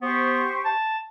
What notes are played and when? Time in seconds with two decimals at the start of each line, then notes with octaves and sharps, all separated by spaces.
0.02 B3 G4 C5 C#6
0.65 A5